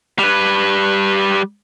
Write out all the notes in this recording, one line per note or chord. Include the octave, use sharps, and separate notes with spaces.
G3 B4